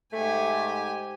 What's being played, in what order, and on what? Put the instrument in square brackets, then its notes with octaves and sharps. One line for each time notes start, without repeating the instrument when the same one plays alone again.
[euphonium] G#2 [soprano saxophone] A3 [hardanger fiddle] G4 G#5